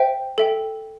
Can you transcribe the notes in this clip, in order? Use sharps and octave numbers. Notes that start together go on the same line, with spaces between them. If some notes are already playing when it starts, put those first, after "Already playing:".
Already playing: C5 E5 G5
A4 E5 G5